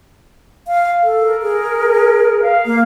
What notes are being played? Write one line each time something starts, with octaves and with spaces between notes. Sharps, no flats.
F5
A4
A#4
G#4
F5
A#3